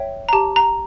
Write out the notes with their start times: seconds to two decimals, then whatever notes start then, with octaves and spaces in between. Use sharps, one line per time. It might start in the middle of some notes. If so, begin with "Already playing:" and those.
Already playing: C#5 E5 G5
0.29 A#5
0.33 G4 A5
0.56 A#5